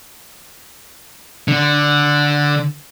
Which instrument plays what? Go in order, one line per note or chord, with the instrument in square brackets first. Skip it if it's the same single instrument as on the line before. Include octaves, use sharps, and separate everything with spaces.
[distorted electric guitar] D3